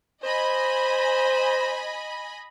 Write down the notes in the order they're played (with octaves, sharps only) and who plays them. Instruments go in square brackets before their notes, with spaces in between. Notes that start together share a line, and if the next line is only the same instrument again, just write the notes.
[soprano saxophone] C5 [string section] D#5 G#5 B5